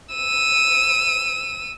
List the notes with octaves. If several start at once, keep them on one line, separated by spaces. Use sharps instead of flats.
E6 D#7